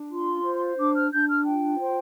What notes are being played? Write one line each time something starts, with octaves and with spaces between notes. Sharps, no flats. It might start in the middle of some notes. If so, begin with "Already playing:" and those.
Already playing: D4
F4 C6
C5
D4 D6
F6
D4 G6
F6
F4 G5
C5